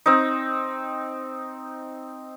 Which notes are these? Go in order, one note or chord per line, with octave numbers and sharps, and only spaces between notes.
C4 D#4